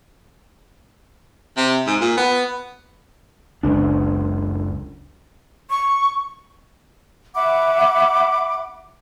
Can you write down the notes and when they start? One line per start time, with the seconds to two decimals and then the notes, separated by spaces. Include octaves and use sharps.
1.57 C3
1.87 G#2
2.01 A#2
2.18 B3
3.63 F#1 C#2 D4
5.70 C#6
7.35 E5 F#5 B5 D6